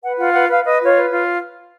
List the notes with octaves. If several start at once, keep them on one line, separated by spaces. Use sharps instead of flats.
B4 F#5
F4 F#5
B4 F#5
B4 F5
B4 D#5
F4 C#5
B4
F4